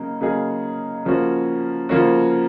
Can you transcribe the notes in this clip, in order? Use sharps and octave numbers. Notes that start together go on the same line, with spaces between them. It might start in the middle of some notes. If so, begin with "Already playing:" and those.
Already playing: C#3 F#3 A#3 D#4
C#3 F#3 A#3 D#4 G#4
C#3 F3 A#3 C#4 F#4
C#3 F3 A#3 C#4 F#4